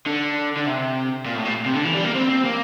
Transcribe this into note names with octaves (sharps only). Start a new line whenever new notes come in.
D3
D3
C3
A#2
A2
A#2
C3
D3
E3
G3
A#3
C4
C4
A#3